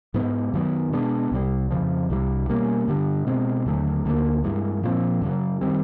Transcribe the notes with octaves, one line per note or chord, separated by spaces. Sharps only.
G#2 E3 G#3 B3
F#2 D#3 F#3 B3
B2 G#3 B3 D4
C2 C3 D#3 G3
F2 C#3 F3
C2 C3 E3 G3
B2 G3 A#3 C#4
G2 D3 G3
B2 G#3 C4
D#2 D3 F#3 A3
D2 D3 G3 A#3
G2 E3 G#3
A#2 F3 G#3 C4
F#2 C#3 F#3
D#3 G3 C4